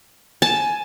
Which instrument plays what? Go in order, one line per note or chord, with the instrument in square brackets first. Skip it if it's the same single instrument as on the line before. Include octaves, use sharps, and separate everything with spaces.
[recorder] G#5 [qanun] A5